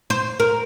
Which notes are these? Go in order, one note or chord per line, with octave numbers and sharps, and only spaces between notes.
C5
A#4